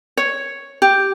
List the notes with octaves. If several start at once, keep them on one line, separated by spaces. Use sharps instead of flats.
C#5
G4